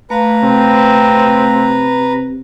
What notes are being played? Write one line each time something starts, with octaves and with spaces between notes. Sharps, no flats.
A3 B4 F5 A#5
C3 C4